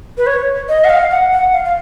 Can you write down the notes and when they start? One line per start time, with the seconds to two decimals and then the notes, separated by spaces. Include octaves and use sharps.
0.18 B4
0.27 C#5
0.69 D#5
0.85 F#5
0.89 F5
1.11 F#5
1.32 F#5
1.53 F5
1.65 F5